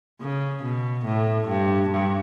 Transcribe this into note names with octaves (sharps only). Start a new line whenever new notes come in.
C#3
B2
A2
G2
G2